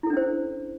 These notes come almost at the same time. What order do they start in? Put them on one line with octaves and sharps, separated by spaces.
E4 A4 D4 C#4 C5